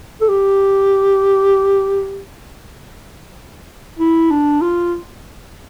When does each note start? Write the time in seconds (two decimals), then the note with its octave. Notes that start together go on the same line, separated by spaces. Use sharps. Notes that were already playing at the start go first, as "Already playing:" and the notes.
0.21 A4
0.29 G4
3.99 E4
4.31 D4
4.61 F4